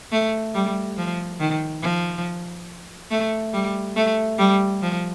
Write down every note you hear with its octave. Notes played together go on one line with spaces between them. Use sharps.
A3
G3
F3
D#3
F3
A3
G3
A3
G3
F3